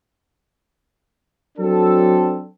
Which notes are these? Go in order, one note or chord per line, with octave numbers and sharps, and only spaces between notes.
F#3 C4 D4 A4